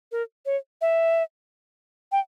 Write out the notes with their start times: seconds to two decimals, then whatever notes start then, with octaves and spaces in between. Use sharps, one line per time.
0.12 A#4
0.46 C#5
0.81 E5
2.12 G5